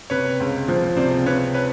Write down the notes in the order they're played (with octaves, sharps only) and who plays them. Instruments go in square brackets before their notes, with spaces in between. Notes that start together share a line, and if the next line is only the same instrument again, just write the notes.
[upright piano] C3 [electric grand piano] B4 C#5
[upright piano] C#2
F3
[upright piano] C3 [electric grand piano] C5 D5
[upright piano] C3 [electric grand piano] B4 C#5
[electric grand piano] B4 C#5